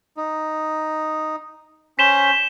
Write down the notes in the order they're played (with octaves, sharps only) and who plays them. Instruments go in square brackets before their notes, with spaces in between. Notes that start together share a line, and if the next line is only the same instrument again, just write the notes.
[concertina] D#4
[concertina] C#4 C5 [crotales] B6 E7 G7